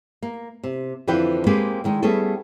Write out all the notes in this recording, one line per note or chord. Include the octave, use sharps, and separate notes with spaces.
A#3
C3
F2 D3 E3 F3 B4 G5
G#3 A#3 C4 G4 G#4 B4
D3 D#3 G#3
G3 A3 B3 C#4 G#4 A4